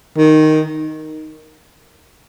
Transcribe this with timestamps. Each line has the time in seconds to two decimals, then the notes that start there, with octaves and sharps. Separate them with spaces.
0.17 D#3